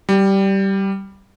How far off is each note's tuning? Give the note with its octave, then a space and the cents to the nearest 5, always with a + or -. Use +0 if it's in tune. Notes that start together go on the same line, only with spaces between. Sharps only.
G3 -10